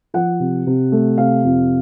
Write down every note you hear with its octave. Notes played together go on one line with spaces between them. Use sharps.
F3 F#5
C3
C3
A3
C3 F5
F2